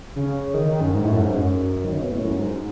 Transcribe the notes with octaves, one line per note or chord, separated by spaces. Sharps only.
C#3
D#3
D#3
F#2
G#2
A2
F#2
G#2
F#2
D#3
C#3
B2
A2
F#2
G#2